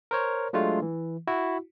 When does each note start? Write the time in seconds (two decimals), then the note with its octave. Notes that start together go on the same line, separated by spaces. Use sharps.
0.11 A#4 C5 C#5
0.53 F#3 G#3 A3 D4 F4
0.82 E3
1.27 E4 F#4